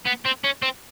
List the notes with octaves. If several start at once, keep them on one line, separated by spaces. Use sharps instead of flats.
B3
C4
C#4
C4